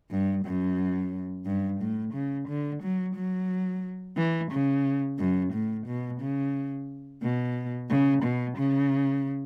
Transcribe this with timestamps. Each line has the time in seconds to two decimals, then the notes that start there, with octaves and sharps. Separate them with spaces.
0.11 G2
0.45 F#2
1.46 G2
1.81 A2
2.14 C#3
2.49 D3
2.83 F#3
3.16 F#3
4.17 E3
4.51 C#3
5.19 F#2
5.53 A2
5.87 B2
6.21 C#3
7.23 B2
7.90 C#3
8.23 B2
8.58 C#3